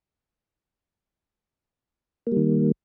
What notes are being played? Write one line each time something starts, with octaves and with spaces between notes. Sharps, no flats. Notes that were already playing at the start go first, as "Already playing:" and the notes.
D#3 G3 A#3